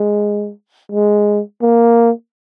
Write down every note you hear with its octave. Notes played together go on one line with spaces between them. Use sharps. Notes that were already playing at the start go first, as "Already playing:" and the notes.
Already playing: G#3
G#3
A#3